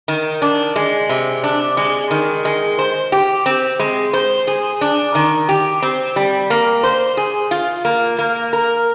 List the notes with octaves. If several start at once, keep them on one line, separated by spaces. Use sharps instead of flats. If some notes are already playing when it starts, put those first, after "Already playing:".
D#3
D4
G#3
C3
D4
G#3
D#3
G#3
C5
G4
C4
G#3
C5
G#4
D4
D#3
G4
C4
G3
A#3
C5
G#4
F4
A#3
A#3
A#4